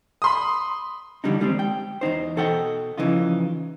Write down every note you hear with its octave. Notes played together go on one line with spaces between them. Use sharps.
B5 C6 D#6
D3 E3 G3 D4 D#4
D#2 G3 G#3 A#3 C4
G5
E2 C#3 D#4 C5
B2 A4 D#5 F#5 G5
C#3 E3 F3 D#4 F4